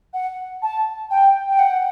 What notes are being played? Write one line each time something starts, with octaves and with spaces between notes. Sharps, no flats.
F#5
A5
G5
G5
F#5